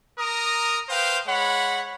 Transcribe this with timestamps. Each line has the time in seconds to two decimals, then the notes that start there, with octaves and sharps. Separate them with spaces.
0.18 A#4 A#5 D#6
0.89 B4 C5 F5 G5
1.27 G#3 C#5 F#5 B5